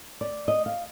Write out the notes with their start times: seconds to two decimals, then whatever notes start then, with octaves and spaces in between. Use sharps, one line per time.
0.21 D5
0.48 D#5
0.66 F5